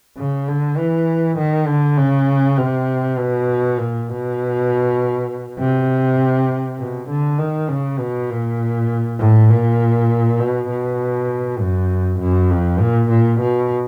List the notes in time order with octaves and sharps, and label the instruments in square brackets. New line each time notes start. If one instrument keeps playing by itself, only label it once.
[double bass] C#3
D3
E3
D#3
D3
C#3
C3
B2
A#2
B2
C3
B2
D3
D#3
C#3
B2
A#2
A2
A#2
B2
B2
F#2
F#2
F2
A#2
A#2
B2